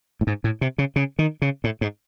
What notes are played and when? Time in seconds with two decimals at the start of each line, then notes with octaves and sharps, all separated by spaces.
0.21 A2
0.27 G#2
0.44 A2
0.61 C3
0.78 C#3
0.96 C#3
1.19 D#3
1.42 C#3
1.64 A2
1.81 G#2